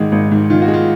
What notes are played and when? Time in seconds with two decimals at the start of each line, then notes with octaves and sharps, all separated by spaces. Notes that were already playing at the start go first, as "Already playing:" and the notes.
Already playing: G#1 G#2 D#3 G#3 F#4
0.12 G#1
0.32 G#2
0.50 D#3 F4
0.62 F#4
0.68 G#3
0.74 F4